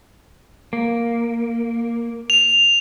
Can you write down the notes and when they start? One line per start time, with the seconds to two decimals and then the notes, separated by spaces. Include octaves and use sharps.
0.73 A#3
2.30 F7